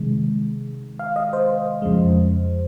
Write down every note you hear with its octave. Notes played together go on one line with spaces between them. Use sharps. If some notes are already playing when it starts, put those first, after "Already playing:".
Already playing: C3 D#3 G#3
F5
D#5
C5
F2 C#3 F3 G#3